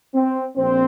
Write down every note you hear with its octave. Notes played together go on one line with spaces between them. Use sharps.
C4
A#1 C4